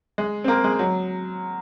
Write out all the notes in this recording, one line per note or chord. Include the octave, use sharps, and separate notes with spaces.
G#3
C4
A#3
G#3
F#3